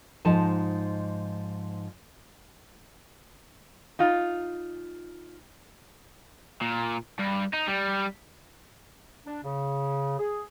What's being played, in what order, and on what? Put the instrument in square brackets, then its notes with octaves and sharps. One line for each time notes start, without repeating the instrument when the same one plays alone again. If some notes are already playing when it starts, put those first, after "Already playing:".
[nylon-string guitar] G#2 F3 D#4 A5
[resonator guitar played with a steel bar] D#4 F4
[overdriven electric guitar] A#2
G2
D#4
G3
[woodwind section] D4
C#3
G#4